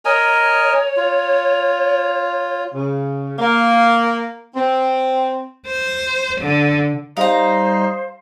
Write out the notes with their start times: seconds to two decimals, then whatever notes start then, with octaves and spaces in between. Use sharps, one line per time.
0.05 A#4 C#5 D#5 G#5
0.97 F4
2.74 C#3
3.39 A#3
4.56 C4
5.67 C5
6.41 D3
7.17 G3 D#4 C5 D#5 F5 A#5